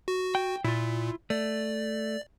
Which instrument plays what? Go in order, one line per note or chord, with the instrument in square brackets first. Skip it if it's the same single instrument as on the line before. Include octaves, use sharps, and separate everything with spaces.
[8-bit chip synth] F#4
[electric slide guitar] G5
[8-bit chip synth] A#2 [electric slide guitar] E4 F4
[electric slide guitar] A3 [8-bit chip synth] D5